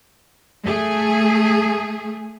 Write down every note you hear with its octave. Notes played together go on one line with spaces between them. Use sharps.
A3 G#4